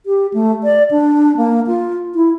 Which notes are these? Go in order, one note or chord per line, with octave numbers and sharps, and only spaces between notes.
G4
A3
D5
D4
A#3
F4
E4